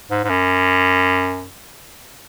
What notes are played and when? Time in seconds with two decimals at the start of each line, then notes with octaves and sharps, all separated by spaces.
0.10 G#2
0.24 G#2
0.29 F#2